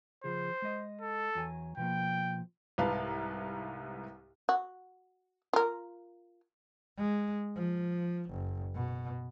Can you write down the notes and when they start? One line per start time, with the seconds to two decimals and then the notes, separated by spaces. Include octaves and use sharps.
0.24 C#3 F3 G#4 C5
0.62 G#3 D#5
1.01 A4
1.35 E2 F#3 G#5
1.77 B2 F3 A#3 G5
2.78 C2 G#2 B4 F5 A5
4.49 F#4
5.53 F4 A#4
6.98 G#3
7.55 F3
8.31 F#1
8.75 B2